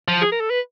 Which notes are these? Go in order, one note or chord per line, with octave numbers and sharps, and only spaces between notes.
F3
G#4
A#4
A4
B4